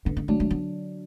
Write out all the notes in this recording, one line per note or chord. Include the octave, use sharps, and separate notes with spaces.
D3 B3
B3
F#3 A3 D4
A3
B3